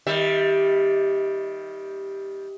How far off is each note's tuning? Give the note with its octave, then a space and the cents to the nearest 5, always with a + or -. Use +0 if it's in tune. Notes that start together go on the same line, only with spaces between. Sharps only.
D#3 +20 G3 +0 E5 +0